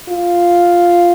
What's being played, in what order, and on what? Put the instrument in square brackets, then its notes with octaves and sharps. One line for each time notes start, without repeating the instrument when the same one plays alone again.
[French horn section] F4